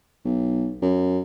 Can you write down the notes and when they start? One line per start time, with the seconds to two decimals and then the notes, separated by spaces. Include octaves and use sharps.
0.24 B1
0.82 F#2